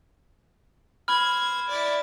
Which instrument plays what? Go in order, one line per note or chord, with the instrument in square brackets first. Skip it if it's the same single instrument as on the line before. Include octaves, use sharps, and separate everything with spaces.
[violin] C5 G#6 [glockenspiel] B5 F6
[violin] E4 D5